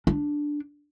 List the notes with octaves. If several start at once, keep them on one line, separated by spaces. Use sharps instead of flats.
D4